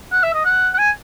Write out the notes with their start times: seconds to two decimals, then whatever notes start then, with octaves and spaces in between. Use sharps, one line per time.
0.12 F#5
0.23 E5
0.34 D#5
0.45 F#5
0.74 F#5
0.78 G#5